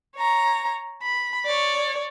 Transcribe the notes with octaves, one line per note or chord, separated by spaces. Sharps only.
C#5 A#5
B5
C#5 D5